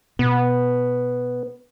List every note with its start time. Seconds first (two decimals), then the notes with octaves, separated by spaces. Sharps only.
0.19 B2 B3